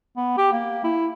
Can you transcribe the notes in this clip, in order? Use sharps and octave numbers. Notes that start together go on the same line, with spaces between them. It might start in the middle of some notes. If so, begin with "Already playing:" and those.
B3
G4
A#3
E4